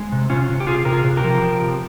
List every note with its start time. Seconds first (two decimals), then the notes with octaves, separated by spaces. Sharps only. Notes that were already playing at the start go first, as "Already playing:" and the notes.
Already playing: G#3
0.12 C3
0.30 C3 C#4 F4
0.50 C3
0.60 G4
0.67 C3 F4 G#4
0.85 C3 A#4
0.92 F4 G#4
1.04 C3
1.17 G4 A#4
1.24 F3
1.42 F3
1.60 C3